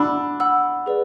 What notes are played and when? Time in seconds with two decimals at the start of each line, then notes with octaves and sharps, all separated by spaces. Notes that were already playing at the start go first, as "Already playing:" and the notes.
Already playing: D4 F#5 B5 E6
0.40 F#5 B5 E6
0.86 G#4 B4 D5